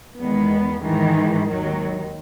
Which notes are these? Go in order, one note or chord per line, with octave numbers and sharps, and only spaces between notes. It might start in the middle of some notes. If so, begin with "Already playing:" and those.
E2 D#3 G#3 B3
G#2 D#3 E3 G#3
D#2 D#3 F#3